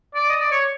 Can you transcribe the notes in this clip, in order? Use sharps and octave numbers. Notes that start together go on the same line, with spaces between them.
D5
D#5
D5
C#5